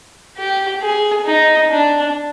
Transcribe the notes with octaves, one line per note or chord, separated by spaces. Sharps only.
G4
G#4
D#4
D4